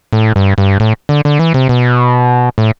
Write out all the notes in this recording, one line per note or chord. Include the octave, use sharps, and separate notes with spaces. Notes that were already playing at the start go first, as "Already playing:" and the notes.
A2
G2
G2
A2
D3
D3
E3
C3
B2
A2